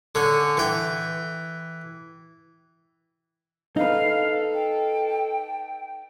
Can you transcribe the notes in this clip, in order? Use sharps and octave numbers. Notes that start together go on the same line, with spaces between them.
D3 C#4
E3 G5
D#4 A4 B4 F5
G5